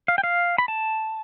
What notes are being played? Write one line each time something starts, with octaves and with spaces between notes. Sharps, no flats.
F5
G5
F5
B5
A5